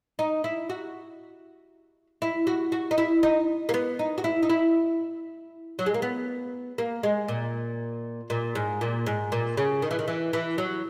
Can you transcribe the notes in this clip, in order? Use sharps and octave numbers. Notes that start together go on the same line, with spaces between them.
D#4
E4
F#4
E4
F#4
F#4
D#4
E4
D#4
A#3
B3
D#4
F#4
E4
D#4
E4
F#3
G#3
A#3
B3
A#3
G#3
A#2
A#2
G#2
A#2
G#2
A#2
C#3
D#3
E3
D#3
E3
E3
F#3